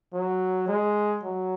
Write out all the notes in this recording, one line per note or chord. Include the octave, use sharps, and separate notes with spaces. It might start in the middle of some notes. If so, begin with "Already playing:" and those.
F#3
G#3
F#3